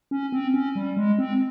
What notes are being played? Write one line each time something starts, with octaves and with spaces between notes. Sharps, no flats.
C#4
C4
C#4
G3
G#3
C4